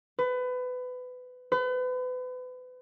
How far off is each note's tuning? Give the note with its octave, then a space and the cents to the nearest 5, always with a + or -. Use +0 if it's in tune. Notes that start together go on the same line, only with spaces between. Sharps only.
B4 +25
B4 +35